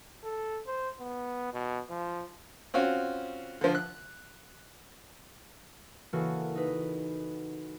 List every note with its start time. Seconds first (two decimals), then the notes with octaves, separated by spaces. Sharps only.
0.24 A4
0.67 C5
1.00 B3
1.54 B2
1.90 F3
2.74 C4 C#4 F4 F#4
3.61 D3 F3
3.75 F#6
6.13 C#3 E3 A#3 F#4 A4
6.55 D#4 B4